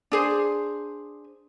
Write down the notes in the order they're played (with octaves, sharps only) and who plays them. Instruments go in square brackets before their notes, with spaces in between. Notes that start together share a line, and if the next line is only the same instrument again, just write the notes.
[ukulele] D4 G#4 C5